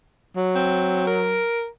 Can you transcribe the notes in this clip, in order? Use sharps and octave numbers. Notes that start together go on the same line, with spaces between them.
F#3
C4
A#4